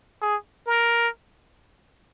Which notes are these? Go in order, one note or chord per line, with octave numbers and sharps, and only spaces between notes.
G#4
A#4